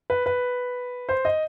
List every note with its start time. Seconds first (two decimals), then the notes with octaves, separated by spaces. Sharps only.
0.10 B4
0.26 B4
1.09 C5
1.25 D#5